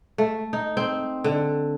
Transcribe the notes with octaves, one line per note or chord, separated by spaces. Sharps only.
A3
D#4
C4
D3